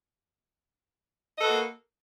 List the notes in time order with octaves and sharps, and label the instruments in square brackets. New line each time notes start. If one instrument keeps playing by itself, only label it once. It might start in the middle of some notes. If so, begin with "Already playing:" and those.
[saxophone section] D#5
A4
B4
F#4
A#3